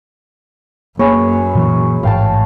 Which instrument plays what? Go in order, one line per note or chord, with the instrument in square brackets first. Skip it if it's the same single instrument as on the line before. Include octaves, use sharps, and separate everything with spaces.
[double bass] F#2 [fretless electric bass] A#3 [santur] G#4 B4 C#5
[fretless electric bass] A#2 E3
[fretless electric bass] A1 G#2 [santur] F5 G5 A5